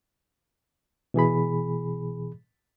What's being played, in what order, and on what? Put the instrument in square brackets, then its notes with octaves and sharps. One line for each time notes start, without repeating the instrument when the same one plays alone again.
[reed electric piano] B2 E3 G#4 B5